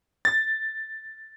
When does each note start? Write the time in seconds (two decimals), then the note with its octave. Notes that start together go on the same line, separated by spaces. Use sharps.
0.25 A6